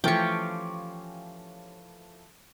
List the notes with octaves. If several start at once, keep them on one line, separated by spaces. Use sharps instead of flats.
E3 F3 A3 C#4 F4 G4 G5 C#6